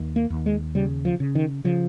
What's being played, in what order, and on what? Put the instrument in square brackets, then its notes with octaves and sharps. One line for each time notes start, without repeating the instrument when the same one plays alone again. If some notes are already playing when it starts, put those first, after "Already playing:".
Already playing: [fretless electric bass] D#2
A#3
D#2
G#3
C#3 G3
F3
C#3
D#3
C#3 F3